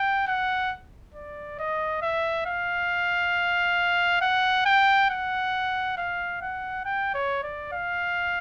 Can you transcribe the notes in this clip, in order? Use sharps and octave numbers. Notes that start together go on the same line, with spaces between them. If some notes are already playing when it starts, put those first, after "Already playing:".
Already playing: G5
F#5
D5
D#5
E5
F5
F#5
G5
F#5
F5
F#5
G5
C#5
D5
F5